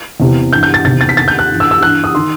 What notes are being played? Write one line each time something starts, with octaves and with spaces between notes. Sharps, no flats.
E2 C3 E3
G2 E3 G6
G6
A6
E2 C3 D#3 A6
A6
B6
D#2 D#3 A6
G6
F#6
G2 E3
E6
E6
G2 E3 F#6
D#6
D#3 C6